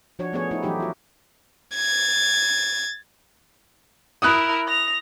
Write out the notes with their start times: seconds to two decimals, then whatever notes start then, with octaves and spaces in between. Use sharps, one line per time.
0.19 F3 D4 F#4 C#5
0.33 F3 A3 B3 C#4 G#4 C#5
0.51 A3 D#4 E4
0.63 E3 F#3 A3 D#4 G4 E5
0.80 F4 F#4
1.76 G#6 A6
4.22 E4 A#4 D#6 F#6
4.67 A#6 F7